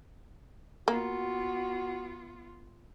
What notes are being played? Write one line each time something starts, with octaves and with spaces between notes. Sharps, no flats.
A#3 B3 F4 F#4